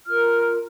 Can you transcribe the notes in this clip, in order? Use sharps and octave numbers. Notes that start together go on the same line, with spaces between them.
F4 A#4 F6